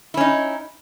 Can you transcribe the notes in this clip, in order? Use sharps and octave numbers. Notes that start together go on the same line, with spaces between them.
C#4 D#4 E4